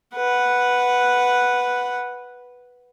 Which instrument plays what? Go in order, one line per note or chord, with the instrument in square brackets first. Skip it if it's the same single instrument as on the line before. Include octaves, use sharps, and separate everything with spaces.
[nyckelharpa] B4 F#5